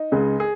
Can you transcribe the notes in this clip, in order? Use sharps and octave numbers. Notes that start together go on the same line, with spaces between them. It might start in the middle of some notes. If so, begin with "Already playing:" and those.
Already playing: D#4
C#2 C#3 G#3
G#4